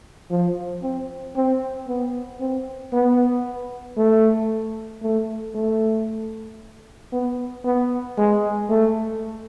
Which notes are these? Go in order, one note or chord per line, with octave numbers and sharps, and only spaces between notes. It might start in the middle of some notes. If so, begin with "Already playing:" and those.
F3
C4
C4
B3
C4
B3
A3
A3
A3
B3
B3
G#3
A3